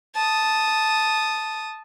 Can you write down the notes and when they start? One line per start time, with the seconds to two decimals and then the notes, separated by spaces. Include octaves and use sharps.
0.15 A5 D#6